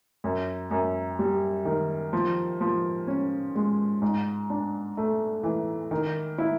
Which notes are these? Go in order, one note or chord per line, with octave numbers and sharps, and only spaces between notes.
F#2
F#2
G3
D#3
F3
F3
C#4
G#3
G#2
D4
A3
E3
D#3
E4